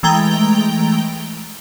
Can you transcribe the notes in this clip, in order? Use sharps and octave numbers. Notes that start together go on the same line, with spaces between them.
E3 G#3 A3 G5 A#5 G7